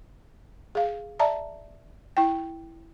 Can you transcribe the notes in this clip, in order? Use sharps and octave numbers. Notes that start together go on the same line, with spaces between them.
G#4 F5
D5 E5 A5 A#5
E4 G5